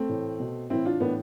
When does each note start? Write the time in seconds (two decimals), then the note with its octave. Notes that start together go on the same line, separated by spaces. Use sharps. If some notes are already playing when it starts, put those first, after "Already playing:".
Already playing: A3 C4
0.09 A2 E3
0.40 B2
0.70 A2 E3 C4 E4
0.85 D4 F4
1.00 A2 E3 B3 D4